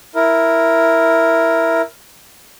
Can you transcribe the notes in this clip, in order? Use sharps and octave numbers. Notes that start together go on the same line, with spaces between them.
E4 A#4